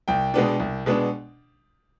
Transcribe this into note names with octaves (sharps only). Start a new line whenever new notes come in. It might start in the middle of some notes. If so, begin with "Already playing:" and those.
C2 G5
B2 G#3 B3 D4
C2
B2 G#3 B3 D4